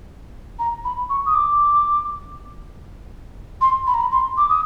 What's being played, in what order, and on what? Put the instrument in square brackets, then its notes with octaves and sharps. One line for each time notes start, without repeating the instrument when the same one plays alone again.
[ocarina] A#5
B5
C#6
D#6
D6
C6
B5
A#5
B5
C6
D6
D#6